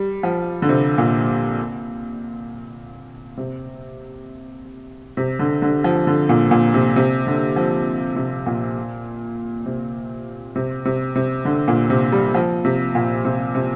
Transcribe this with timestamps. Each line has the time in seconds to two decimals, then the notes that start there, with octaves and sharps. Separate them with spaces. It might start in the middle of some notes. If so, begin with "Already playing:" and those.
Already playing: G3
0.23 F3
0.62 D3
0.69 C3
0.98 A#2
3.37 C3
5.17 C3
5.39 D3
5.62 D3
5.84 F3
6.07 D3
6.29 A#2
6.51 A#2
6.74 C3
6.96 C3
7.27 D3
7.56 F3
8.16 C3
8.46 A#2
9.66 C3
10.56 C3
10.85 C3
11.15 C3
11.45 D3
11.68 A#2
11.90 C3
12.12 G3
12.35 F3
12.65 C3
12.95 A#2
13.25 C3
13.55 C3